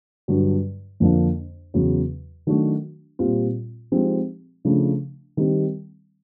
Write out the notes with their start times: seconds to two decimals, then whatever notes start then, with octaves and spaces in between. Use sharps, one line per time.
0.28 G2 D3 F#3
1.00 F2 D3 F3 A#3 D4
1.74 E2 C#3 F#3
2.47 D#3 F#3 A3 D4 F#4
3.19 A#2 G3 C4 F4
3.92 F3 G#3 C4 D#4 G4
4.65 C#3 F3 A3 D4
5.37 D#3 G3 C4